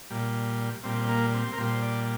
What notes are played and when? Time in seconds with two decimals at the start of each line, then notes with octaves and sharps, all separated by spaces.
0.10 A#2 G3
0.84 A#2 G3 C4
1.09 A#3
1.34 C4
1.53 A#4
1.58 A#2 G3 C5
1.82 D5